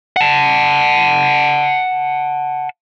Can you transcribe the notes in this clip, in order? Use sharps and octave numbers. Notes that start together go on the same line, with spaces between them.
F#5 A5